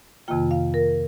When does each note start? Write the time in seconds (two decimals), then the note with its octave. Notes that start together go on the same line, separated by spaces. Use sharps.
0.28 F2 C3 D#3 A#3 F4 G5
0.51 F5
0.74 A#4